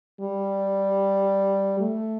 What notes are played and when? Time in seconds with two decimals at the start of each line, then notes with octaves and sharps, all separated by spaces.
0.21 G3
1.81 A3